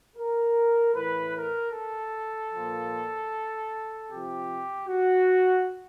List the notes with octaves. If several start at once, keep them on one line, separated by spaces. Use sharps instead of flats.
A#4
A2 E3 B4
A#4
A4
A#2 F3
C3 F3 G4
F#4